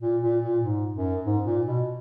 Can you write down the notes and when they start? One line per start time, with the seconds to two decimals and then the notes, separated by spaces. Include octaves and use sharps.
0.01 A#2
0.21 A#2
0.43 A#2
0.62 G#2
0.94 F#2
1.25 G#2
1.45 A#2
1.66 B2